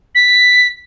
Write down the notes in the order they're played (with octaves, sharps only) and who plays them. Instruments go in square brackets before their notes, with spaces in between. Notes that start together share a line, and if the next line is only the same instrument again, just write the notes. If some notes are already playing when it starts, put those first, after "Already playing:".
[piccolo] B6